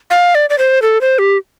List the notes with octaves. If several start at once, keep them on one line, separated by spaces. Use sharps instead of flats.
F5
D5
D5
C5
A4
C5
G4